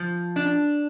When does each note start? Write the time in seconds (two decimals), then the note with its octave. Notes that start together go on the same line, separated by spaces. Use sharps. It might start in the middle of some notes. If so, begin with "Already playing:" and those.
Already playing: F3
0.36 D4